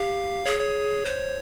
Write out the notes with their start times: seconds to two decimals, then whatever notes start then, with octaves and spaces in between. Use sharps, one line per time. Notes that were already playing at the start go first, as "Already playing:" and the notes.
Already playing: G4 F5
0.45 G#4 C#5
0.60 C#5
1.05 C5